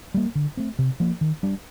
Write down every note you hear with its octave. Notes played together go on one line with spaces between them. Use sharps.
G3 A#3
D3
A3 C4
C3
F3 A#3
D#3
G3 D4